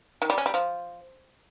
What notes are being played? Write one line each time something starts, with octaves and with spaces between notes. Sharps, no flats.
D#3
G3
C#4
G3
F3